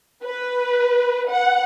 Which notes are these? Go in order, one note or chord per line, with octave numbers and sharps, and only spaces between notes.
B4
F#5